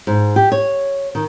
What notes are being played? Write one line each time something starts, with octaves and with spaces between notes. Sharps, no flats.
G#2
G4
C#5
D#3